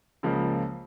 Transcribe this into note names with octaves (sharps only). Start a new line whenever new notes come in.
C#2 C#3 F3 A#3